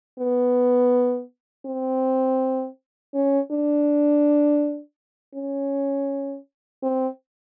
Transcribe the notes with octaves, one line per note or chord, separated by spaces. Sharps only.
B3
C4
C#4
D4
C#4
C4